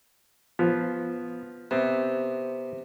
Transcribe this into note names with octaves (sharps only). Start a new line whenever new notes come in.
F3 B3
C3 B3 C4